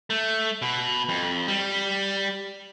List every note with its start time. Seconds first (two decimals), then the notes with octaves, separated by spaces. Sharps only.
0.10 A3
0.62 B2
1.09 F2
1.48 G3